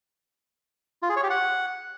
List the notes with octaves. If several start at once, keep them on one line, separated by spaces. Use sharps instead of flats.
F4
G#4
C#5
G4
F#5